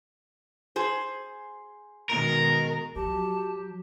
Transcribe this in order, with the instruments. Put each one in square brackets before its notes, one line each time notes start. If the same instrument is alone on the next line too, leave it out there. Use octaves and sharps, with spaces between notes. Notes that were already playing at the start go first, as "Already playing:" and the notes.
[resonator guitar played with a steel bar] G#4 C5
[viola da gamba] B2 D#3 G#3 [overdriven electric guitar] A#4
[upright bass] F3 [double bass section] F#3 [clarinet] G4 [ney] A5